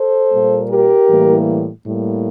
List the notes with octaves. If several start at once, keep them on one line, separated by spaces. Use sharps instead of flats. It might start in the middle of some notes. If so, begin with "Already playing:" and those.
Already playing: A4 C5
A#2 G3 A#3
G4 A#4
A2 E3 G3 A#3
A2 G3 A#3